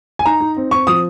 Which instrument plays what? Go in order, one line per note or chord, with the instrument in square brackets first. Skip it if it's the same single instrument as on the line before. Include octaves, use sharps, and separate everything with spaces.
[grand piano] G#5
D#4 A#5
D#4
C4
C4 C#6
F3 D#6